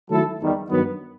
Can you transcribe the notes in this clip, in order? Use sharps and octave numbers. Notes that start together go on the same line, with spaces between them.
D#3 F#3 A3 E4 A4
E2 D#3 G3
G2 D#3 F#3 B3